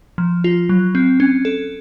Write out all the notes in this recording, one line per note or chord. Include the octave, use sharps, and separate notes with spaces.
F3
F4
F#3
C4
C#4
A4